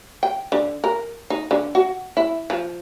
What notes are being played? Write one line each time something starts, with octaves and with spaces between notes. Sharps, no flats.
G5
D3
A#4
D#4
D3
F#4
E4
F3